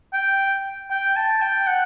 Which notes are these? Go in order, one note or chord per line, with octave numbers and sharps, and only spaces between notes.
G5
G5
A5
G5
F#5